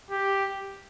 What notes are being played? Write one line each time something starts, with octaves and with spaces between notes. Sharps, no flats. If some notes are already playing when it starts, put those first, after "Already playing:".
G4